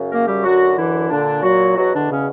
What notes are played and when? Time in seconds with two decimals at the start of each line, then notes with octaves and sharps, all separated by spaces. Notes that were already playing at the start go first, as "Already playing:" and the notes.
Already playing: F#2 C#3
0.10 A#3 A#4
0.26 G3 G4
0.43 F#2 D3 F#3 F#4
0.76 E3 E4
1.09 A#2 D3 D4
1.43 F#3 F#4
1.77 E2 B2 F#3 F#4
1.93 D3 D4
2.10 C#3 C#4